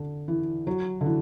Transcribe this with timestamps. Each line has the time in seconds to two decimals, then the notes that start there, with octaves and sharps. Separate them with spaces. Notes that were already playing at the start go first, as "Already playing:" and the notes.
Already playing: D3
0.28 E3
0.67 F#3
1.01 D3
1.06 E3